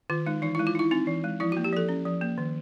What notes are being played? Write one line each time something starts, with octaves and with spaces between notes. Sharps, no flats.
D#3 F4
G#3 D#4
E3 D#4
E4
G#3
F4
D#4 E4
C4 D#4
E3
G#3
F3 E4
F#4
A#3
G4
F3 A4
C#4
F3
A#3
D#3